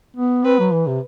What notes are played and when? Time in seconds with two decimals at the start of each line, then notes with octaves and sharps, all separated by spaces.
0.17 B3
0.44 C4 B4
0.59 F#3
0.73 E3
0.87 C3